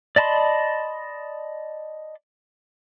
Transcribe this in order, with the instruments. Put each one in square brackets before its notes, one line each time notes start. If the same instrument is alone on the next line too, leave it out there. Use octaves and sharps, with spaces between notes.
[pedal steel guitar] D5 D#5 A5 B5 C6